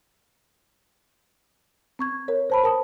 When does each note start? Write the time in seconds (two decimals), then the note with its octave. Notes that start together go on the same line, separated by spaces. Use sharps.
1.99 C4 C#6 G#6
2.28 A#4 C#5
2.50 C5 A5 B5
2.64 A#4 A5 D#6